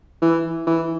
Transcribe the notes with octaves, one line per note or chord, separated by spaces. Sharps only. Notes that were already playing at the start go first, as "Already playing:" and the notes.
E3
E3